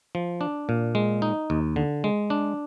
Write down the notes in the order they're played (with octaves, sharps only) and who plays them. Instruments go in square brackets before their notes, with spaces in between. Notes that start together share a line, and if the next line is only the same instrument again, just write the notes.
[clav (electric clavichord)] F3
D4
A#2
G#3
D#4
D#2
D3
G#3
D4